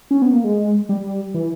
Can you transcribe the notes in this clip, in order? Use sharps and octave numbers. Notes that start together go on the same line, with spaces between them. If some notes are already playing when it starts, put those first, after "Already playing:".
C#4
B3
A#3
G#3
G3
E3